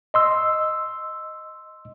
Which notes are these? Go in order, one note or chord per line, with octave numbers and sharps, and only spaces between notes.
D#5 C6 E6